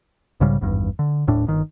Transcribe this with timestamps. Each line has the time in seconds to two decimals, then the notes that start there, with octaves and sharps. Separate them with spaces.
0.40 B1 G#2 C#3 G3
0.61 G#1 E2 G2
0.99 D3
1.27 D#1 A2 D4
1.47 G1 D#3